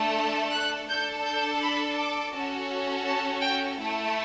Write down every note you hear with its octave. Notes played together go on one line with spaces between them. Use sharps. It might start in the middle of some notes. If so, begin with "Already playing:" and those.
Already playing: A3 D4 A4
F#6
D4 A4 G6
G6
B5
D6
C#4 F#4 A4
A5
G5
A3 E4 A4